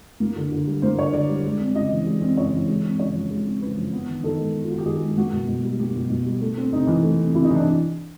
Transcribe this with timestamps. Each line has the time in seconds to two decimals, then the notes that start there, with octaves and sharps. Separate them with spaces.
0.20 A#3
0.36 D3
0.52 D3
0.67 G3
0.82 A#3 C5
0.98 D3 C#5
1.13 D3 D5
1.29 G3
1.45 G#3
1.60 C4
1.75 C#3 D#5
1.91 E3
2.07 G#3
2.22 C4
2.37 C#3 C#5
2.54 E3
2.68 G#3
2.84 C4
2.99 C#3 C#5
3.15 F3
3.31 G#3
3.46 C4
3.61 C#3 B4
3.78 F3
3.93 B3
4.09 D#3
4.23 D#3 A4
4.40 G#3
4.55 B3
4.64 F4
4.70 D#3 F#4
4.78 G4
4.86 D#3 G#4
5.02 G#3
5.17 A#3 F#4
5.33 B2
5.48 B2
5.64 G3
5.80 A#3 G4
5.95 B2
6.10 B2
6.26 G3
6.41 A3
6.57 C4
6.72 C3 D#4
6.87 E3
7.03 A3
7.19 C4
7.34 C3 E4
7.44 D#4
7.50 E3 D4